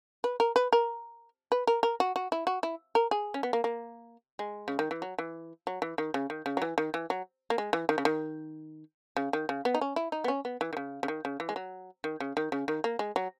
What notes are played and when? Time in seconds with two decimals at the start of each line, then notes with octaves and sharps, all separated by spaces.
0.24 B4
0.40 A#4
0.56 B4
0.73 A#4
1.52 B4
1.67 A#4
1.83 A#4
2.00 F#4
2.16 F#4
2.32 E4
2.47 F#4
2.63 E4
2.95 A#4
3.11 G#4
3.34 C#4
3.43 B3
3.53 A#3
3.64 A#3
4.39 G#3
4.68 C#3
4.79 D#3
4.91 E3
5.02 F#3
5.19 E3
5.67 F#3
5.82 E3
5.98 D#3
6.14 C#3
6.30 D#3
6.46 C#3
6.57 F#3
6.62 E3
6.78 D#3
6.94 E3
7.10 F#3
7.50 A#3
7.58 G#3
7.73 E3
7.89 D#3
7.98 C#3
8.05 D#3
9.17 C#3
9.33 D#3
9.49 C#3
9.65 B3
9.75 D#4
9.81 C#4
9.96 E4
10.12 D#4
10.24 B3
10.28 C#4
10.45 B3
10.61 E3
10.73 D#3
10.77 C#3
11.03 C#3
11.08 D#3
11.25 C#3
11.40 E3
11.49 G#3
11.56 F#3
12.04 D#3
12.20 C#3
12.37 D#3
12.52 C#3
12.68 D#3
12.84 A#3
12.99 G#3
13.16 F#3